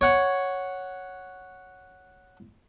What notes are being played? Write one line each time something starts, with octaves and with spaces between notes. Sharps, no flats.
C#5 F#5